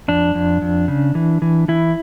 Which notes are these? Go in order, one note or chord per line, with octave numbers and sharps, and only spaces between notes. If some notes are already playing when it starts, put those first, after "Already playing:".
F2 D4
F2
F2
C#3
E3
E3
E3 E4